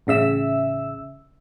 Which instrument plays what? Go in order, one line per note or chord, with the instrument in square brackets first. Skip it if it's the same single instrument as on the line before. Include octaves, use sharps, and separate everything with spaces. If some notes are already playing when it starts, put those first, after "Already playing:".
[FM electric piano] A1 C#3 E5 E6